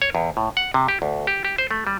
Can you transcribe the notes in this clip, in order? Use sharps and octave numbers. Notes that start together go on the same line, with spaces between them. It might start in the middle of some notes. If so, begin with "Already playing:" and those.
C#5
E2
A2
F#5
C3
G4
D2
G4
G4
C5
A3
G3